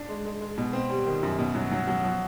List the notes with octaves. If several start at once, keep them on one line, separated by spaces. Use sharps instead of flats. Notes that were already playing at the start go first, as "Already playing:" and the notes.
Already playing: D4
G#3
G#3
G#3
B2
C4
G3
D#3
F#2
B2
F#3
F#3
F#3
F3